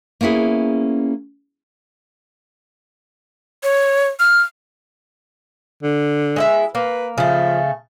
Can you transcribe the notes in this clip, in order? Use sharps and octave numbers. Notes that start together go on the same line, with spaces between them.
A#3 B3 C#4 E4 G#4
C#5
F6
D3
G#3 E4 E5
A#3 B4
C#3 F3 A3